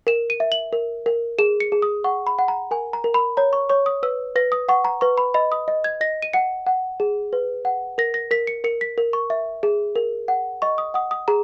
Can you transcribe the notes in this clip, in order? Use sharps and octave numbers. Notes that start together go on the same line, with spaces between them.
A#4 E7
D#7
E5
F#7
A#4
A#4
G#4 E7
C#7
G#4
D#6
F#5 C#6
B5
F#5
A#5
A#4 G#5
A#5
A#4
B5
C#5 A#5
C#6
C#5 C#6
D#6
B4 E6
B4 A#6
D#6
F#5 C#6
A#5
B4 C#6
B5
D#5 B5
D#6
D#5
G#6
D#5 A#6
D#7
F#5 C#7
F#5
G#4
B4
F#5
A#4 A#6
A#6
A#4 B6
C#7
A#4 C#7
B6
A#4
C#6
E5
G#4
A#4
F#5
D#5 C#6
D#6
F#5 D#6
D#6
G#4 A#5